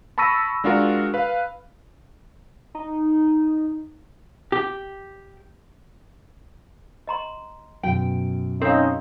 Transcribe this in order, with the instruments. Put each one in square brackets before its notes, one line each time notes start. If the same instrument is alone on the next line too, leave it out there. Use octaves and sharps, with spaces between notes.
[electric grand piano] A5 B5 C#6 E6 A#6 D#7
G#3 D4 F4 F#4 A#4
B4 F5
[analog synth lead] D#4
[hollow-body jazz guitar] G4
[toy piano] D#5 A#5 C6
[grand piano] F#2 B2 [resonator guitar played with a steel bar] G5
[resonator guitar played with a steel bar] C4 [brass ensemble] C#4 D#4 [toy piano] A4 F5